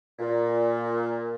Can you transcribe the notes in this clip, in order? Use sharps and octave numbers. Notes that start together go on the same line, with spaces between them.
A#2